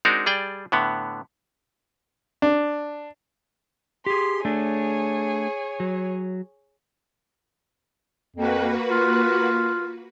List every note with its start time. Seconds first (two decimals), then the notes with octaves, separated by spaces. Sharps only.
0.05 G#3 C4 D4 D#4 F#4 A#4
0.26 G3 G#4 D5 G5
0.72 A2 D3 B3
2.42 D4
4.06 G4 G#4 C6
4.45 A3 D4 G#4 C#5
5.80 F#3
8.36 F2 A#3 F#4 B4
8.91 F4